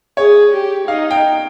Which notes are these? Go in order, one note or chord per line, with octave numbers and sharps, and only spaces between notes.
G#4 C#5
G4
D#4 F5
G5